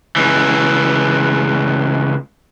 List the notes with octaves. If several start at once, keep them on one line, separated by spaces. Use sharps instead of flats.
C#2 E3